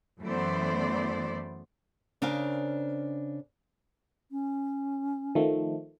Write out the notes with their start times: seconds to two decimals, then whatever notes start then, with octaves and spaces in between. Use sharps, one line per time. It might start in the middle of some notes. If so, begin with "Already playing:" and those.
0.22 F#2 E3 A3 B3 C5 D5
2.22 C#3 D4 A#4 C5 F5
4.31 C#4
5.35 D#3 F3 A3